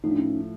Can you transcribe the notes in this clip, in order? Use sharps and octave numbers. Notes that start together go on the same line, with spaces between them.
A2 F3 A3 D#4
D4
C#4 D#4